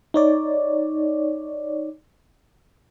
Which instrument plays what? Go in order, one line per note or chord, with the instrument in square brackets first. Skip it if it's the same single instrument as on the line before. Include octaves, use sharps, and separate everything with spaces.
[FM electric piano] D#4 C#5 D5